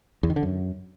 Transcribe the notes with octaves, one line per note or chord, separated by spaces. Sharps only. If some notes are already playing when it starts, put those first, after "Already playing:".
E2
D#3
D3
F#2